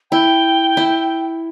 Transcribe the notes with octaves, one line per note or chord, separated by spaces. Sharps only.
E4 G5
E4